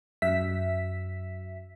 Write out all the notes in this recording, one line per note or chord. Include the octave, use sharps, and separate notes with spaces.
F#2 E5 B6